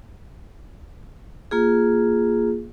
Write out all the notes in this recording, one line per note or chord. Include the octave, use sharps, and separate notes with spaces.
A#3 F4 G#4